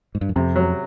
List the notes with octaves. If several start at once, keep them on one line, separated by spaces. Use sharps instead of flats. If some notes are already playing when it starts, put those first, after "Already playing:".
G#2
G2
F#2
F2 C3
F#3